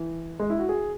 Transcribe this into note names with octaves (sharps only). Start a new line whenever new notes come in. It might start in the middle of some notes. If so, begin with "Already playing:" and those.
Already playing: E3
G#3
E4
F#4
G#4